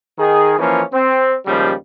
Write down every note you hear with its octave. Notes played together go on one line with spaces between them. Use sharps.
D#3 G#4
E3 F3 A#3 C#4
C4
D#2 C#3 F3 G3 G#3